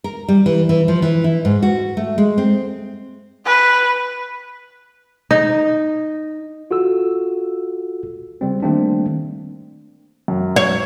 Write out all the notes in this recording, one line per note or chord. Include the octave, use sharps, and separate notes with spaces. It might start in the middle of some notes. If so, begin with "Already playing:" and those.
A#4
G3
E3
E3
F3
E3
E4
G#2
F#4
A3
G#3
C4
B4
D#4
F4 F#4 A4 E6
C#3 G3 C4
D#3 G3 A3 A#3 C4 D4
F#2
C#5